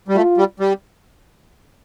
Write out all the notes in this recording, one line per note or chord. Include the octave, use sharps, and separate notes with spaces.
G3
A3 F4
G3
G3